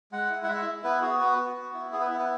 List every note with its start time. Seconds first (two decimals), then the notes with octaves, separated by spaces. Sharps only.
0.12 G#3 F#5
0.30 E4
0.43 F#5
0.48 G#3 E5
0.66 E4
0.84 B3 B4
1.02 F#4 G#4
1.20 B3 B4
1.39 F#4
1.56 B3
1.74 E4
1.92 B3 G#4
2.01 B4
2.10 E4 E5
2.19 B4